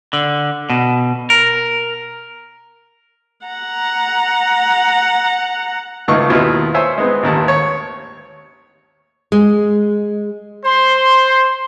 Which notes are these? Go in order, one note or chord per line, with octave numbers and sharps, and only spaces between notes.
D3
B2
A#4
F#5 A#5
G#1 C#2 A3 D#4 F5 C#6
D#2 B2 E4 F4
C5 C#5 E5 G#5
G#3 B3 C4
A1 D#2 A5
C#5
G#3
C5 C6